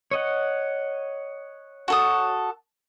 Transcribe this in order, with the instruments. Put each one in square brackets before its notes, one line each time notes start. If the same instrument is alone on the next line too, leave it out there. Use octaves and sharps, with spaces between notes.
[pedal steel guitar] C#5 D#5 F#5
[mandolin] F#4 A4 D#6